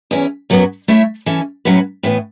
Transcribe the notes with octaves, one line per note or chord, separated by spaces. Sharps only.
E2 E3 C#4
F#2 F#3 B3 F#4
A3 E4 C#5 E5
E3 C#4 A4
A2 F#3 C#4 F#4 B4
A2 E3 B3